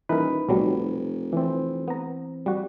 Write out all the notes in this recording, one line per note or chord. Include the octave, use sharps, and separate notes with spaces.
D#1 E3 D#4 A#4 B4
F1 B1 F#3 G3
E3 C4
B3 A#5
G3 F#4